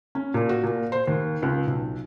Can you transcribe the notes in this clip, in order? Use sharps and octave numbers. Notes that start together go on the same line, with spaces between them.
C#4
A#2
F#4
A#2
C5
D#2
C#2
B1